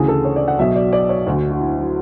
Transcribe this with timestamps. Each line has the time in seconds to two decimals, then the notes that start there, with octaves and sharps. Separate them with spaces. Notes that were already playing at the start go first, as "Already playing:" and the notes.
Already playing: D2 C#3 E3 G#4
0.08 A4
0.25 C#5
0.36 D5
0.48 F#5
0.59 B1 B2 E5
0.75 D5
0.93 D5
1.09 C#5
1.26 D2 D3 F#4
1.51 F#4
1.60 E4
1.77 F#3